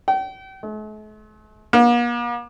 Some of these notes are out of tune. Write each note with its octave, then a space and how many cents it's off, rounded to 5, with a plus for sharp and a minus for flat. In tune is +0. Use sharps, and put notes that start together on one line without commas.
G5 -35
A3 -45
A#3 +45